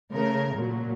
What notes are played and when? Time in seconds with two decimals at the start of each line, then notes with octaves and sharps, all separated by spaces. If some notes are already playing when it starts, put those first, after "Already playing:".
0.13 C#3 A3 A#4
0.55 A#2 F#3